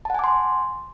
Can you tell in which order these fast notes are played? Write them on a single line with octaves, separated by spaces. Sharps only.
A5 F#5 G#5 D6 C6